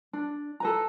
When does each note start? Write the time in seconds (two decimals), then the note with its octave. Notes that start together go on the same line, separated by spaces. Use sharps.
0.13 D4
0.60 A4 B4 A#5